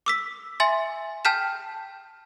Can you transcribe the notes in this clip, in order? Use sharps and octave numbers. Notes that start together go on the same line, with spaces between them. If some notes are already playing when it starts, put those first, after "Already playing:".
D6 E6 B6
E5 G#5 C6 A6
G5 A5 F6 G6 B6 E7